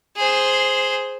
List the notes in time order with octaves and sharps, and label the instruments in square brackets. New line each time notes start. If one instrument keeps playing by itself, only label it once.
[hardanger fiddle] G#4 C5